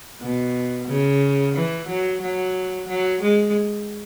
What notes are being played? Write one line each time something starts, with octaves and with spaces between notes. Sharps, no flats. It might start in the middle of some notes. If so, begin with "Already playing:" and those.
B2
C#3
E3
F#3
F#3
F#3
G#3